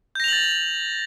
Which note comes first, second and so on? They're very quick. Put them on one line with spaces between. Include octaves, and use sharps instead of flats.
G6 A#6 F7 F#7 A6